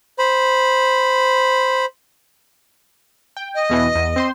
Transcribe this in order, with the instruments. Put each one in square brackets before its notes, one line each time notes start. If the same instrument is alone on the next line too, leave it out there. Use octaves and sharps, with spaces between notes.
[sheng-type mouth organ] C5 B5
[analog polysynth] G5
[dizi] D#5
[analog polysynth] E2 B2 E3
E2
C4 C5 C6